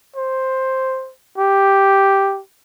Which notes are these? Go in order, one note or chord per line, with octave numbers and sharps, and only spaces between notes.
C5
G4